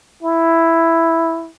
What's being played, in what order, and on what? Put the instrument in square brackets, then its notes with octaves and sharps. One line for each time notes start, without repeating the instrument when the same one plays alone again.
[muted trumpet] E4